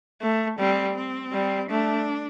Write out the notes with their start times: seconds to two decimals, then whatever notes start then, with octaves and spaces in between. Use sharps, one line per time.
0.22 A3
0.59 G3 C4
0.96 C4
1.32 G3
1.70 A3 D4